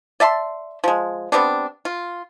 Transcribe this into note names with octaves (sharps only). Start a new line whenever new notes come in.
D5 E5 A5 C6
F3 G#3
G3 B3 C4 D4
F4